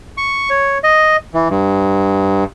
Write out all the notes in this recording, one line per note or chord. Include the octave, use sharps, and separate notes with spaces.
C#6
C#5
D#5
E3
G2